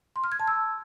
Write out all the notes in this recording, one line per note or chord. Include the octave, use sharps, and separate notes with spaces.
C6
F6
G#6
A5
E6